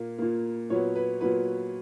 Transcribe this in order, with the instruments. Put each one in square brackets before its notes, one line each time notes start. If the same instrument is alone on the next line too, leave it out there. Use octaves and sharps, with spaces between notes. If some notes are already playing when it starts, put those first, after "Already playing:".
Already playing: [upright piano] A#2 A#3
A#2 A#3
A#2 F#3 B3 C#5
B4
A#2 F#3 B3 B4